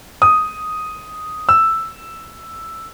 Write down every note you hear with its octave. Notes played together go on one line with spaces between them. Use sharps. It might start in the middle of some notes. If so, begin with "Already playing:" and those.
D#6
E6